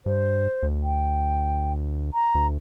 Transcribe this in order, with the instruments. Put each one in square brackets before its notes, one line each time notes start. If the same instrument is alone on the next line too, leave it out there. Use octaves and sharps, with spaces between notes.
[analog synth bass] G2 [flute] C5
[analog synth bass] D2
[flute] G5
A#5
[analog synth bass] D2